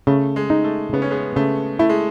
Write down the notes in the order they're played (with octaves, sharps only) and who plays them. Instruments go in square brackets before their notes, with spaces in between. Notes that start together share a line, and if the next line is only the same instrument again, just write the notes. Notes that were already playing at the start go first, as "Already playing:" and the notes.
[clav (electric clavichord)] C#3 [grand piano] A3
[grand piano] G#3
[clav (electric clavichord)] D#4
[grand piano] A3
[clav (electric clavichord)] C#3 [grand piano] B3
[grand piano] C#4
G#3 B3
[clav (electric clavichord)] C#3 [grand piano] A3
[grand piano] A3 [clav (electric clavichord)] E4
[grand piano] G#3